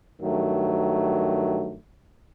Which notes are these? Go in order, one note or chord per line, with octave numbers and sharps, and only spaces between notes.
G2 D#3 F#3 A3